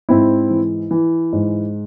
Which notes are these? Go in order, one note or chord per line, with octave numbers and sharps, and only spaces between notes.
G#2 C4 E4
E3
E3
G#2